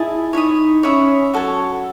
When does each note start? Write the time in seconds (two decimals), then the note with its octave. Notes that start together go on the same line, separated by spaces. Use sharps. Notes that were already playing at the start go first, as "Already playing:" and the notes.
Already playing: E4 G#4 D#5 A5
0.33 D#4 C#5 E5 B5 D#6
0.83 C#4 C#5 E5 B5 D#6
1.33 F#3 F#4 A4 C#5